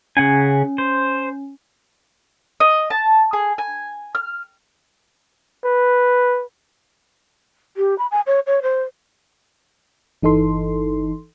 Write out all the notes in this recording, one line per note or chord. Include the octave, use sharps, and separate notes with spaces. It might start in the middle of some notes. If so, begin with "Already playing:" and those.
C#3 C#4 F#5 G#5
C5
D#5
A5
G#4
G#5
F6
B4
G4
B5
G#5
C#5
C#5
C5
G1 E3 D#4 A4 C6